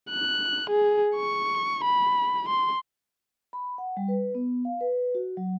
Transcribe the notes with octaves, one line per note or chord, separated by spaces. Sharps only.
F#6
G#4
C#6
B5
C6
B5
F#5
G3
B4
B3
F5
B4
F#4
F#3